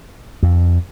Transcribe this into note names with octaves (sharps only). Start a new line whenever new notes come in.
F2